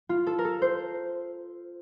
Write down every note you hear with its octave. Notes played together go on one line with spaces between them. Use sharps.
F4
A4
A#4
A4
C5